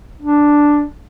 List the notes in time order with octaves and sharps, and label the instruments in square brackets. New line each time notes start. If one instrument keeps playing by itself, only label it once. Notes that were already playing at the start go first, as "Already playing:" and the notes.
[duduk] D4